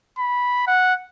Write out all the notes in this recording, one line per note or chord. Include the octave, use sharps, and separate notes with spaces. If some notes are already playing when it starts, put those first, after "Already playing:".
B5
F#5